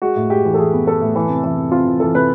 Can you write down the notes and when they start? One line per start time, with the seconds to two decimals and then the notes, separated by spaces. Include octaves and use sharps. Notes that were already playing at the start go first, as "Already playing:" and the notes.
0.02 G#3 F#4
0.16 A2
0.30 G#3 G4
0.45 E3
0.54 A4
0.58 E3 G#4
0.73 B3
0.87 B3 A4
1.01 A2
1.16 E3
1.29 C3
1.44 E3
1.58 C3
1.72 C4 F4
1.87 E3
2.00 E3 A4
2.14 C3 B4